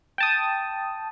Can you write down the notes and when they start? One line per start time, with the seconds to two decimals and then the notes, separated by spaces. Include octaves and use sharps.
0.18 G5 A5 D#6